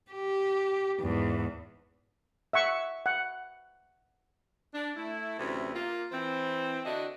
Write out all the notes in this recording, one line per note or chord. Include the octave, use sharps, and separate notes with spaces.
G4
E2 G#2
E5 F#5 C#6
F#5
D4
A3 E4
D2 C3 E3 C4 C#4
A#3 F4
E3 C4
D3 D4 E4 F#4 D#5